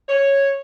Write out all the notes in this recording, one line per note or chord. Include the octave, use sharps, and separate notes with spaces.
C#5